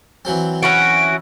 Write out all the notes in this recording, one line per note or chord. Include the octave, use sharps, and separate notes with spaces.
E3 F#3 C4
C#4 E4 F#4 D7